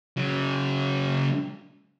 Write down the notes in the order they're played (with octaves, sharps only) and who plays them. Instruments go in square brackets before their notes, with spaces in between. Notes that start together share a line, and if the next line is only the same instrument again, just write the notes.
[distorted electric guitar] C#3 F#3